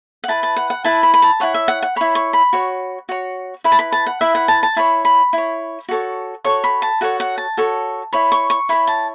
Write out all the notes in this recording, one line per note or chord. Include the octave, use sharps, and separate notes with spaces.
F#5
E4 B4 A5
A5
F#5
F#5
E4 B4 A5
B5
B5
A5
E4 C#5 F#5
E5
F#5
F#5
E4 C#5 B5
C#6
B5
F#4 C#5
F#4 C#5
E4 B4 B5
A5
B5
A5
F#5
E4 B4 E5
F#5
A5
A5
E4 C#5 B5
B5
E4 C#5
F#4 A4 C#5
F#4 A4 C#5 C#6
B5
A5
F#4 A4 C#5 F#5
F#5
A5
F#4 A4 C#5
E4 C#5 B5
C#6
C#6
E4 C#5 B5
A5